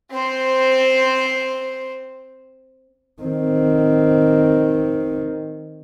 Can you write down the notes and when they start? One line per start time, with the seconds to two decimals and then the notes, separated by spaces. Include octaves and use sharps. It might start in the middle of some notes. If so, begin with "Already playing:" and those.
0.11 C4 C5
3.22 D#3 C4